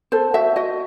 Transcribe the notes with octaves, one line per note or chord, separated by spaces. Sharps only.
A4 C5
F#4 E5
F#4 D#5